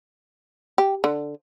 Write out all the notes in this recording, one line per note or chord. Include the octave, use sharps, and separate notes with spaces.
G4
D3